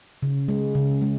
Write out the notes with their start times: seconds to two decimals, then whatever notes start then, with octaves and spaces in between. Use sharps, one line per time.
0.22 C#3
0.48 G#3
0.75 C#3
1.02 G#3